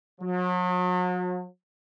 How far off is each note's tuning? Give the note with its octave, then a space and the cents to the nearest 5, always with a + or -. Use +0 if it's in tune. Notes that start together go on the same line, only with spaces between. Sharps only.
F#3 -40